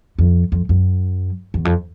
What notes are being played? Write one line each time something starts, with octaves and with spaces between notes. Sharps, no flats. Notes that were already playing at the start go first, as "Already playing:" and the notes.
F2
F2
F#2
E2
F2